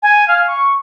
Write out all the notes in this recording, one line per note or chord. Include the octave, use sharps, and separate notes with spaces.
G#5
F5
C#6